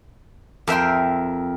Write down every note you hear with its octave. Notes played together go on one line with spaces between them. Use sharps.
F2 A#4 E5 G5 C6